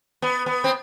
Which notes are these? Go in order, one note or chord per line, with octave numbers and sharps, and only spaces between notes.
B3
B3
C4